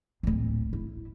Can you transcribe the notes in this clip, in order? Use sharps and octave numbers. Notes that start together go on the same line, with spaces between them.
D1 A#1
E4